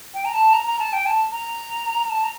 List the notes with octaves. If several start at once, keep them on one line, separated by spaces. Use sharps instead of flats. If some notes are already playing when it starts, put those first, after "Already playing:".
G5
A#5
A5
A#5
A#5
A5
G5
A5
A#5
A5
A#5